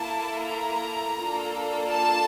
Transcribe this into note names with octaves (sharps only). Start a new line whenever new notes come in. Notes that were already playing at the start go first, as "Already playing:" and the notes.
Already playing: A#3 E4 A4 A5
A#5
A#3 D4 F4 A4
A5